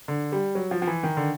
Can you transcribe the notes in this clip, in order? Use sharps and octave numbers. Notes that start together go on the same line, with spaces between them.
D3
G3
F#3
F3
F3
E3
D#3
D3